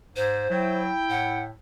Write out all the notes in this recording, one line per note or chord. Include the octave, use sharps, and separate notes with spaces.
G#2 C5
F#3 E4 G5
A2 F#5